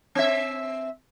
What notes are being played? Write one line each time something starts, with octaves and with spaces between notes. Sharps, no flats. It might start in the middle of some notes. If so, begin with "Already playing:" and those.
C4 E5